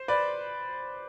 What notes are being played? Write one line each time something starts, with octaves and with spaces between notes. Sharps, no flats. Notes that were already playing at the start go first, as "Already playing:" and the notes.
Already playing: C5
B4 D5